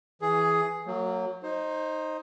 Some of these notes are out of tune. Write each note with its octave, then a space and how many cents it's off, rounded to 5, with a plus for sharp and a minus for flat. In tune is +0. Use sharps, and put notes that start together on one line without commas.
E3 +0 G#4 +10
F#3 +0 A#3 -40
D#4 +0 C5 +20